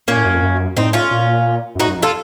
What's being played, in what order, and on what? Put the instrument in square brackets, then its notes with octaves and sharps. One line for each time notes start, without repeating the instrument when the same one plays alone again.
[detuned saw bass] A#2 [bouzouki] A#3 C#4
[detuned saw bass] A2
F#2
F2
F#2
[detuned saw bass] A2 [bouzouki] C4 D#4
[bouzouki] C#4 F4
[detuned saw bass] A#2
F#2
[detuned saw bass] A2 [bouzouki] D#4 F#4
[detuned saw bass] F#2
F2
[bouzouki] F4 A4